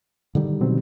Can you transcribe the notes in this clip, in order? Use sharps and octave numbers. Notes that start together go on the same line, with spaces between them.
D3 D#3 G3
B2 F#3 C4